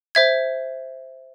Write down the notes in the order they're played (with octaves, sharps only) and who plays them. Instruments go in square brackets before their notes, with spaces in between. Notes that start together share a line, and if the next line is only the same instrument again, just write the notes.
[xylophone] C5 E5 G#6